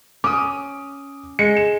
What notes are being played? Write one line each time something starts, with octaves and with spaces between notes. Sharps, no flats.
C#4 D6 D#6
G#3 C#7
E7